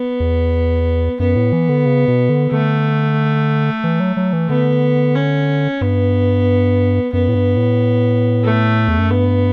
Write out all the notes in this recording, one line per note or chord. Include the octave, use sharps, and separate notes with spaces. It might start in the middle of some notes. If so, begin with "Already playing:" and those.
Already playing: B3
E2
F#2 B3
A2
E3
D3
C#3
B2
D3
D3 A3
E3
F#3
F#3
E3
D3 B3
C#4
G2 B3
F#2 B3
A2
G2
A2
A3
E2
F#2
G2 B3